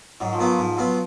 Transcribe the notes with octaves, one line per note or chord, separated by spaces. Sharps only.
G#2 F#3
F3
F#3 B3 F4
G#2
F#3 B3 F4